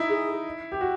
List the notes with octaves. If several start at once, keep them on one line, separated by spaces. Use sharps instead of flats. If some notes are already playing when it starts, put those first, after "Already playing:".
Already playing: D#4 E4
G#4
G4
F#4